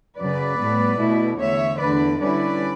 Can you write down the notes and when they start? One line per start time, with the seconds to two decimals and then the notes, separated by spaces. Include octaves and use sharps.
0.18 F#2 C#3 F#3 B4 D5
0.58 A2 G3 B3
0.98 B2 A3 E4
1.38 E2 D3 A3 C#5 E5
1.79 E2 D3 A3 B4 D5
2.19 D3 G3 C#4 E4 B4 D5